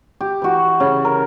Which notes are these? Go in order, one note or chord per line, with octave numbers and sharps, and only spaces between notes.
G4
E3 F#4
C#3
A#4